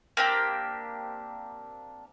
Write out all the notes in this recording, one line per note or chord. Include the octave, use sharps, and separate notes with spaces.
A#3 C4 D4 G4